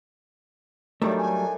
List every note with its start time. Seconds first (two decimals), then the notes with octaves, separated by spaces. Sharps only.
1.02 A2 D#3 F#3 G3 A3 D4 D5
1.18 G#5